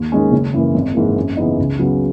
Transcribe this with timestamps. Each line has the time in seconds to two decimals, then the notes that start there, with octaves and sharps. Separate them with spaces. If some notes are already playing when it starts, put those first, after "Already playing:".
Already playing: D#2
0.12 D#3 G#3 C#4
0.32 F#1
0.53 F#2 E3 A#3
0.75 G#1
0.95 G#2 E3 A#3
1.16 F#2
1.37 C#3 E3 B3 D#4
1.59 C#2
1.79 C#3 F#3 B3